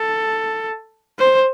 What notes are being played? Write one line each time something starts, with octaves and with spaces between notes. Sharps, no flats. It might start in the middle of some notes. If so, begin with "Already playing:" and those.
Already playing: A4
C5